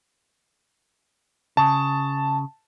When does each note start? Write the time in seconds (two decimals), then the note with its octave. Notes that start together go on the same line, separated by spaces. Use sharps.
1.57 C#3 A5